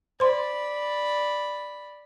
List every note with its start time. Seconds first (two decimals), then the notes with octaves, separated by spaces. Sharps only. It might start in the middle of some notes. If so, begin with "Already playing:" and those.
0.20 C5 D5 B5 C6